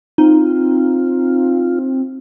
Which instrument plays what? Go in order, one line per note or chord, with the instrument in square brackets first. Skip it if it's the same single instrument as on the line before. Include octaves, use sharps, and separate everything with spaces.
[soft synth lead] C4 [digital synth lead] D#4 [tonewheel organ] F4